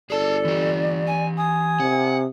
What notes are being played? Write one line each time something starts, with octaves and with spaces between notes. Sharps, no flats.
G1 G#4 A4 D5 A5
E3 G4
G#5
G#5 D#6
C3 F#5